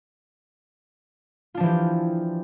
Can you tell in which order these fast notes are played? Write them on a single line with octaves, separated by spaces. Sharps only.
F4 D4 F3 E3 G4